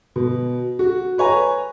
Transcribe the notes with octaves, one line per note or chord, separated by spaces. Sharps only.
B2
F#4
B4 C#5 G#5 A#5